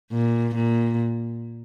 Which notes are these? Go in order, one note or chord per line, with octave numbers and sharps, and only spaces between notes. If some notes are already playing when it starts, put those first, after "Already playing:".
A#2
A#2